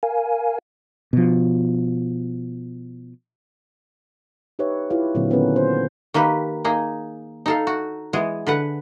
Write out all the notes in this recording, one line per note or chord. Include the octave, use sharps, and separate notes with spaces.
A#4 F5 G#5
B2 F3
D#4 G4 B4 C#5 E5
E4 F4 G4 B4 C#5 F5
A#2 D3 F#3 C4
D#3 B3 C#4 G4 A#4 B4
C5
D#3 A#3 G4 B4
A#3 D#4 G#4
D#4 A4 F5
F#4
E3 G#3 B3 G#4
D3 B4 F#5